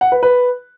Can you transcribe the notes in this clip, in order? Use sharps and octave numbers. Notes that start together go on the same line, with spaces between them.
F#5
B4
B4